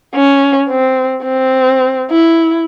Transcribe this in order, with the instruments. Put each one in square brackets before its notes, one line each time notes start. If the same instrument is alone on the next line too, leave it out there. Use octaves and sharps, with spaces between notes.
[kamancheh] C#4
C4
C4
E4